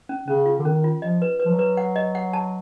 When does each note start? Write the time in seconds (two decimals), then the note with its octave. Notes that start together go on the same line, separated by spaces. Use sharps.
0.09 C#4
0.28 C#3 C#4
0.46 F4
0.60 D3
0.65 D#3 C#4
0.84 F4
1.02 F3 D#5
1.22 B4
1.40 B4
1.45 F3
1.52 F#3
1.59 B4
1.77 F#5
1.96 D#5
2.15 F#5
2.33 A5